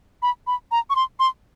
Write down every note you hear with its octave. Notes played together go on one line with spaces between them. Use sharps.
B5
B5
A#5
C#6
C6
C6